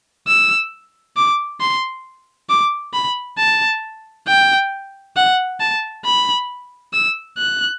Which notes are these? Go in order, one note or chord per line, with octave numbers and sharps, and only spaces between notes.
E6
D6
C6
D6
B5
A5
G5
F#5
A5
B5
E6
F#6